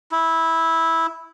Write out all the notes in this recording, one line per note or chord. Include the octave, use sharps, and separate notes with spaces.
E4